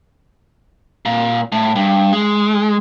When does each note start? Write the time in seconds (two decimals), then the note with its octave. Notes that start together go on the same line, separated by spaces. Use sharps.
1.05 A#2
1.52 A2
1.75 G2
2.13 G#3